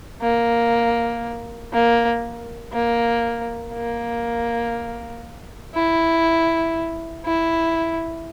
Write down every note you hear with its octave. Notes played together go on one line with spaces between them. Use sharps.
A#3
A#3
A#3
A#3
E4
E4